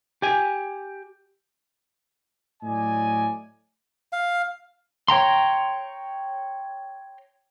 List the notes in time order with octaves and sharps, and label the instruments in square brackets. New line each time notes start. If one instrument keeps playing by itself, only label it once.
[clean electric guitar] G4 G#5
[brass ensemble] A2 F#3 D5 D#5 G#5
[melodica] F5
[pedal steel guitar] C#5 G5 A#5 C6